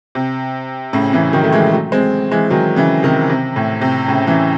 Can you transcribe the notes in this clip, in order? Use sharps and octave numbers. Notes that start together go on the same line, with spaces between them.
C3
A2 C#3
C#3 E3
D#3 F#3
A3
E3 G#3
F#3 A3
G#3 C4
E3 G#3
D#3 F#3
C#3 E3
C3 D#3
C3
A2
C3
A2 C#3
C#3 E3